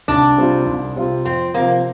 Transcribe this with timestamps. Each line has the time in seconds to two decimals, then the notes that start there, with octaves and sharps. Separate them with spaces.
0.08 C2 D4
0.38 C3 G3 C4 F4
0.66 C2
0.96 C3 G3 C4 F4
1.25 F2 C4
1.54 C3 F3 A#3 C4